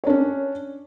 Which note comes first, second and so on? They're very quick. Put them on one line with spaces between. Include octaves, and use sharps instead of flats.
C#5 D4 C#4